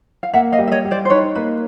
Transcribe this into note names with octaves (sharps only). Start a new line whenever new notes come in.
F5
A#3 E5 F#5
D#5 F5
G3
E5
C#5 D#5
G3
C5 D5
C5
D#4 B4 C#5
A#3 B4